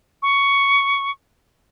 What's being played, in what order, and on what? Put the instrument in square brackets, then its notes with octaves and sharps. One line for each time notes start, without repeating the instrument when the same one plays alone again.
[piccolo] C#6